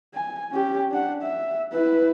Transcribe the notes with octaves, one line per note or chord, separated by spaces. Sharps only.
G#5
C#4 G4
D4 F#5
E5
E4 B4